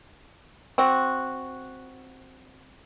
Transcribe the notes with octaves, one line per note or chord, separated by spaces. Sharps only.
C4 F#4